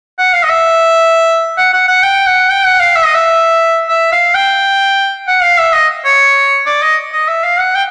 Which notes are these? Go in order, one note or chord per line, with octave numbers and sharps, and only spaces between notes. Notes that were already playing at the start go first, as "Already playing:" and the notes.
F#5
F5
D#5
E5
F#5
F#5
F#5
G5
F#5
G5
F#5
F5
E5
D#5
E5
E5
F5
G5
F#5
F5
E5
D#5
C#5
D5
D#5
D#5
E5
F5
F#5
G5